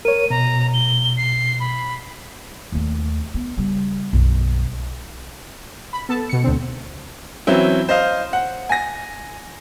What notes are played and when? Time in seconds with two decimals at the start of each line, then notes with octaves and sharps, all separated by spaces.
0.05 A#4 C#5 D#7
0.30 B2 A#5
0.74 G7
1.17 C7
1.60 B5
2.72 D#2 A3
3.34 B3
3.58 C#3 G3
4.13 B1 F#2
5.93 B5
6.09 B3 A4 A5
6.29 B2 C#7
6.44 D2 D3 C4
7.47 E3 F#3 C4 C#4 E4
7.89 C5 D#5 F5
8.33 F#5
8.69 G#5 A#6